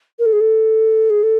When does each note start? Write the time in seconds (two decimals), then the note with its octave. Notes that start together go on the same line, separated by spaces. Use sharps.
0.19 A#4
0.26 A4
0.33 G#4
0.41 A4
1.10 G#4
1.23 A4